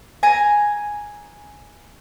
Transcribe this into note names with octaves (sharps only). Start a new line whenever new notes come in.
G#5 A#5